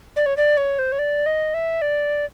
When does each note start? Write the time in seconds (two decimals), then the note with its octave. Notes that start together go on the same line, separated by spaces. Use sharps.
0.16 D5
0.26 C#5
0.37 D5
0.57 C#5
0.79 C5
0.92 C#5
0.99 D5
1.26 D#5
1.54 E5
1.82 D5